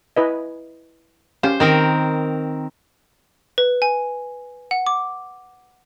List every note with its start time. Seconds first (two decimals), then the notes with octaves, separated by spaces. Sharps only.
0.16 E4 B4 D#5
1.43 C#4 G4 C5 F5
1.60 D#3 C4 A#4
3.58 B4
3.82 G#5
4.71 F#5
4.87 D6